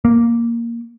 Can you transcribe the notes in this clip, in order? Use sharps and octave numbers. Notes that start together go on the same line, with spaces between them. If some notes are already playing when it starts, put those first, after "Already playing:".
A#3